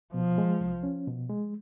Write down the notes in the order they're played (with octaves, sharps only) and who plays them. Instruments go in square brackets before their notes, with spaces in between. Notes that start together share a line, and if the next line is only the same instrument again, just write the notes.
[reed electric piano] B2 [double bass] F3
[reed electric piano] G#3
C2
C#4
B2
G#3